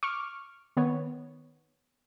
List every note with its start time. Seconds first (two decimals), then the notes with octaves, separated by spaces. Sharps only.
0.03 C#6 D6 F6
0.77 D#3 B3 C#5